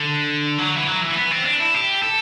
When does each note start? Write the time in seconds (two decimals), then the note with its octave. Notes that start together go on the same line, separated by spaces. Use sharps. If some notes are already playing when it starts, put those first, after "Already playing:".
Already playing: D3
0.58 F#3
0.76 E3
0.87 F#3
1.01 E3
1.16 B3
1.31 C4
1.45 D4
1.59 E4
1.74 G4
2.02 A4